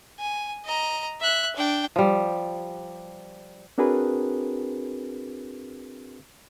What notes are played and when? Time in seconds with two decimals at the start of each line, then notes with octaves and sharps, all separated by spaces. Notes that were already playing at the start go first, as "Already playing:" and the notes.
0.19 G#5
0.65 D#5 A#5
1.20 E5 F#6
1.56 D4 G5
1.96 F3 G3
3.78 C4 D4 F#4 G#4 A#4 B4